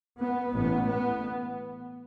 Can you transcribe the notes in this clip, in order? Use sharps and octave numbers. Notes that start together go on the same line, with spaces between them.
B3
A1 A2 B3
B3